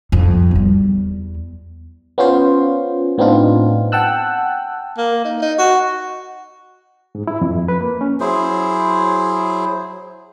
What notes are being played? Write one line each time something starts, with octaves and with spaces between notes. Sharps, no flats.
G1 F2
E2 G3
B3 C#4 F4 C5
A2 B3 C4 D4 D#4 F4
F#5 G5 A5 E6 F#6
A#3
D#4
D#4
F#4
G#2
E4
F2
B4
A#3
C#4
F#3 E4 G#4 C5